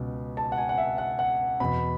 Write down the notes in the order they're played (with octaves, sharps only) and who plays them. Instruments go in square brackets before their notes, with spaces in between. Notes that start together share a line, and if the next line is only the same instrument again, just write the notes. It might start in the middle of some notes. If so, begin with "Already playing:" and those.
Already playing: [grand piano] C#2 B2
A5
F#5
G#5
F#5
E5
F#5
F#5
E2 B2 B5